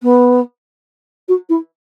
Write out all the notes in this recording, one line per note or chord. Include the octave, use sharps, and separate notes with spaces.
B3
F#4
E4